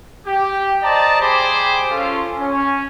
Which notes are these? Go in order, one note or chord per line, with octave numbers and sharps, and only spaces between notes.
G4 G5
C5 D5 D#5 A5 A#5
G3 G4 G#4 C5 B5 D6
C#4 F4 A4
C#4